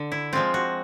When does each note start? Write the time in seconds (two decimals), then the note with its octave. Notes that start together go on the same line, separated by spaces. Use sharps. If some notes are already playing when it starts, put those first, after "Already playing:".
Already playing: D3
0.12 E4
0.33 F3 G#3 C4 F4
0.54 F#4